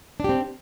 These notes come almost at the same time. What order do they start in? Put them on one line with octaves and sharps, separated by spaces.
D4 G4 C4